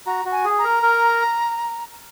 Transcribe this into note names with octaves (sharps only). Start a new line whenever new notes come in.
F#4 A#5
F#4
G#5
G#4
A#5
A#4
A#4